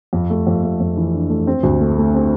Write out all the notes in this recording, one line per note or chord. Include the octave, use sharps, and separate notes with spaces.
F2
A3
F2
A3
F2
E3
D4
A3
C4
D2
A3
A3
C4